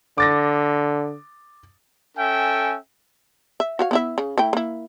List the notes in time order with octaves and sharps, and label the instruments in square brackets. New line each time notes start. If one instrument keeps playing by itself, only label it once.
[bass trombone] D3 [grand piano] D6 A6 A#6
[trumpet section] C#4 A4 E5 G5 G#5
[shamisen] E5
F#4 C#5 F5
B3 E4 E5
C#3
A3 E4 G5
A#3 E4